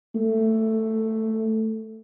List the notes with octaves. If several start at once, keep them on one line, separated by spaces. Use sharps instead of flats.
A3